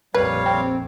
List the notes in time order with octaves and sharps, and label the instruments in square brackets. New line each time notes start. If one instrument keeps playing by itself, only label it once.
[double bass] A#1 F2 [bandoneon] G3 C#5 F5 [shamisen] B4
[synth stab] C4